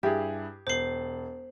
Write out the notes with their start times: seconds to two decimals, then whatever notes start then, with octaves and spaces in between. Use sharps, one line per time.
0.03 G2 E4 G4 G#4
0.67 E1 C5 C7 F#7